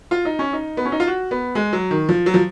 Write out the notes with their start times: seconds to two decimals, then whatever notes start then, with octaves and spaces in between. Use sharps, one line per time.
0.11 F4
0.25 D#4
0.39 C#4
0.53 D#4
0.77 B3
0.85 C#4
0.92 D#4
1.00 F4
1.07 F#4
1.31 B3
1.55 G#3
1.73 F#3
1.91 D#3
2.09 F3
2.26 F#3
2.34 F3